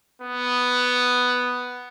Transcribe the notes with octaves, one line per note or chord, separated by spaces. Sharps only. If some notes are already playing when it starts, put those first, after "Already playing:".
B3